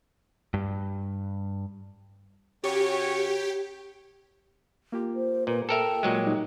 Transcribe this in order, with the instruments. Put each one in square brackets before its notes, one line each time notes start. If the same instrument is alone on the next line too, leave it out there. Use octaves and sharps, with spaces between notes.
[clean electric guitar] G2
[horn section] C#3 F#4 C#5 [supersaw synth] G4
[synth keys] A#3 F4 G4
[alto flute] C5
[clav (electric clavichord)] A#2 [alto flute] B4
[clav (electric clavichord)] A4 A#4 E5 [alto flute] G5
[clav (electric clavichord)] A#2 F#3 G#3
[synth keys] G3 D#4